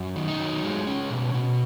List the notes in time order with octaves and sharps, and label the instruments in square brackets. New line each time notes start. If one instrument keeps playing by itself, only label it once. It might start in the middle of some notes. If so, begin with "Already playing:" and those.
Already playing: [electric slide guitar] F#2
D#3
D#4
F#3
G#3
C#4
B2
B2